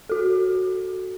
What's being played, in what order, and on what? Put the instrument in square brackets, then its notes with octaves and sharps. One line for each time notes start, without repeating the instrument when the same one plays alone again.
[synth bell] F#4 A4